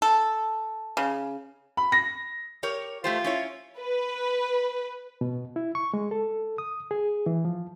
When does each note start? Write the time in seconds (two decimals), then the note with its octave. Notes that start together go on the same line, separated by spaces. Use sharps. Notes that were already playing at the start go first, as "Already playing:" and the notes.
0.02 A4
0.97 C#3
1.77 B5
1.92 A#6
2.63 G4 A#4 C#5
3.04 A3 F4 G4 C5
3.24 C#4 E4 C#5
3.78 B4
5.21 B2
5.56 E4
5.75 C#6
5.94 G#3
6.11 A4
6.58 D#6
6.91 G#4
7.26 E3
7.45 F3